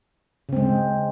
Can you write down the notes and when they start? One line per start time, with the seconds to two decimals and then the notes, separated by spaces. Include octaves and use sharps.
0.49 C#3
0.53 C4
0.56 G#3